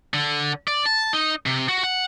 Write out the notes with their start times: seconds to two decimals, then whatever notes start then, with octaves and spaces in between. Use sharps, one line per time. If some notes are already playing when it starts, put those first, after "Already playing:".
0.14 D3
0.68 D5
0.86 A5
1.13 D#4
1.46 C3
1.69 F#4
1.84 F#5